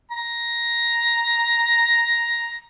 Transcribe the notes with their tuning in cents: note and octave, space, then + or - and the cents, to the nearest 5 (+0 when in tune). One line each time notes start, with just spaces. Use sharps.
A#5 +10